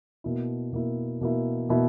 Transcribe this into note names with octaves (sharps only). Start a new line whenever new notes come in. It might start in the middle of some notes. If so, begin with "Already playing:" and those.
B2 A#3 E4
B2 A#3 E4
B2 A#3 E4
B2 A#3 E4